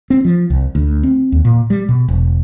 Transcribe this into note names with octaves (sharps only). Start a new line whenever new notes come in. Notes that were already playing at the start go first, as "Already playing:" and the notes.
C4
F3
C2
D2
C4
D#2
A#2
G3
B2
E1